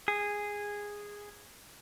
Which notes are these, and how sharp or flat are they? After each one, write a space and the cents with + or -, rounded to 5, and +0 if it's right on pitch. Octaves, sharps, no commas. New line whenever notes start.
G#4 -10